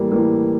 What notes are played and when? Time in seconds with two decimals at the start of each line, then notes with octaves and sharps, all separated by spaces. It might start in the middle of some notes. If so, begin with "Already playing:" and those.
Already playing: A2 E3 G3 A#3
0.12 A2 E3 G3 A#3